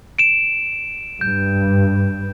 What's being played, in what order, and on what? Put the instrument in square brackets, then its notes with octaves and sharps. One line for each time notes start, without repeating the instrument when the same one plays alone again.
[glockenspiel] D7 E7
[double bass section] G2 [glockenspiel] G6